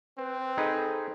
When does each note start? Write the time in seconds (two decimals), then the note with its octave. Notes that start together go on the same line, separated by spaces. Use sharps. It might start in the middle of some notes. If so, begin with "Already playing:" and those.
0.18 C4 B4
0.57 D#4 G#4 A4 B4